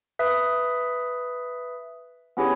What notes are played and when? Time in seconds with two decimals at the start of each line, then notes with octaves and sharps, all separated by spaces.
0.19 B4 E5 D#6
2.37 B3 C#4 E4 G4 G#4 C#5